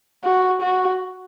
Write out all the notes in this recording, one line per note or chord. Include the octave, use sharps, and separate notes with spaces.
F#4
F#4